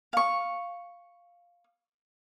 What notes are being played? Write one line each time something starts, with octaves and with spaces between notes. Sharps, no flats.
F5 C#6